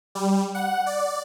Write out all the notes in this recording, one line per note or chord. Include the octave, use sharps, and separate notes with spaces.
G3
F#5
D5